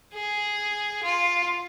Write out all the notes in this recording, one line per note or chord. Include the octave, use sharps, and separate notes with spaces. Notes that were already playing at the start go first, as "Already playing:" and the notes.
G#4
F4